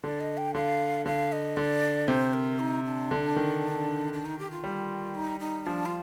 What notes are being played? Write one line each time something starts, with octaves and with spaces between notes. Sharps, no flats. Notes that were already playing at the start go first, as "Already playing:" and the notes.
D3 D5
D#5
G5
D3 F5
D3 F5
D#5
D3 D5
C3 C5
A#4
D#4
D4
D3
D#3
D4
D#4
G4
F4
G3
D#4
D#4
F3 D4
F4